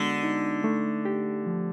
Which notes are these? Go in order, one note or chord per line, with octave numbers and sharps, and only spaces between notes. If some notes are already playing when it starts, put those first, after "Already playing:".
Already playing: D3 G#3 B3 F#4
D#4
A3
G4
F3